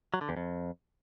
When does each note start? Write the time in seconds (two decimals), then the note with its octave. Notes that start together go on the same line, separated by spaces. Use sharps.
0.14 F#3
0.21 D3
0.29 E2
0.37 F2